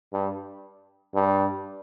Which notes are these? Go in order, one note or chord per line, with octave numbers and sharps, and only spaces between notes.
G2
G2